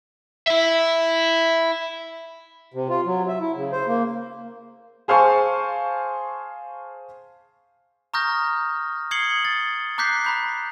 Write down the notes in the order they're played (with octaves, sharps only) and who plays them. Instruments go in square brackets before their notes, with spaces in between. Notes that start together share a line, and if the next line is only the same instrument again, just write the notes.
[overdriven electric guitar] E4 E5
[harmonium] C3
F4
F#3
E5
E4
C#3
C5
A#3
[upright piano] G#4 C5 F5 G#5 A5 C#6
[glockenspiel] A#5 C#6 D#6 F6 G6 A#6
D#6 G#6 C7 C#7 F#7 G7
A6
A#5 D6 F#6 G6 B6 C7
A#5 B5 G6